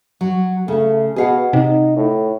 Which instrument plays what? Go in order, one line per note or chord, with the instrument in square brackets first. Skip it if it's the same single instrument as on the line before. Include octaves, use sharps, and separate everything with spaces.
[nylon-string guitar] F#3
[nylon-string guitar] C#3 [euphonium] A3
[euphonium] B2 [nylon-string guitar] G#4 F5 F#5
[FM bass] C3 [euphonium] D#4
[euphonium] A2